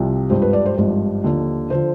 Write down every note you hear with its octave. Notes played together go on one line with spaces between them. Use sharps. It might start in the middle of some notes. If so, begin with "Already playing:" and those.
Already playing: C2 C3 F3
G#1 G2 F3 C5
B4
D5
C5
G#1 G2 F3
D#2 D3 F3
D3 F3 C5